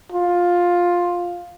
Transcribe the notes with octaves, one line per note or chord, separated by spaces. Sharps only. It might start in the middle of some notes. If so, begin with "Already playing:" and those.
F4